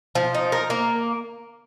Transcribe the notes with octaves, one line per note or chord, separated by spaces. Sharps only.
F3
D#4
A#4
A#3